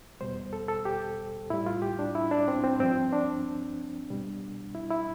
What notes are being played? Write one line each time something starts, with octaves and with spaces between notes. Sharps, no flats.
E2 B2 G3 C5
A4
A4
G4
A2 G3 E4
F4
G4
D4
E4
D4
C4
C4
G2 F3 C4
D4
B2 G3
E4
E4